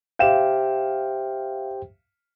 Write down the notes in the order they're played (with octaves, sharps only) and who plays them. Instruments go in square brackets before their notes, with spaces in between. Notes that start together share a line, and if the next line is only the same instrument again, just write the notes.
[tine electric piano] G4 C5 G5 [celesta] E5 [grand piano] F5 E7